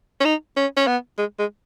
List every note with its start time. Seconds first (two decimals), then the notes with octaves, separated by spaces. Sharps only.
0.21 C#4
0.25 D#4
0.57 C#4
0.77 C#4
0.87 B3
1.18 G#3
1.39 G#3